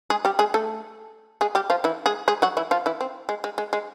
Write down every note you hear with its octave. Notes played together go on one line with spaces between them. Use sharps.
G#3 G#4
G3 G4
G#3 G#4
A3 A4
G#3 G#4
G3 G4
F3 F4
E3 E4
G#3 G#4
G#3 G#4
F#3 F#4
E3 E4
F3 F4
E3 E4
C4
G#3
G#3
G#3
G#3